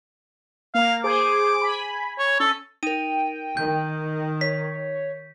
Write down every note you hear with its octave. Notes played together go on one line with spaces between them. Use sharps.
A#3 F5
G#4 C5 D6
G#5 B5
C#5
C#4 A4
D#4 A#4 G5 D#7
D#3 G6
C#5 B6